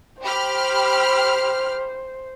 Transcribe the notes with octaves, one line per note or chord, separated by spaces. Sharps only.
G4 C5 B5 F6